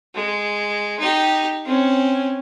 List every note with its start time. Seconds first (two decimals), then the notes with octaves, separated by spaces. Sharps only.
0.14 G#3
0.99 D#4 G4
1.65 C4 C#4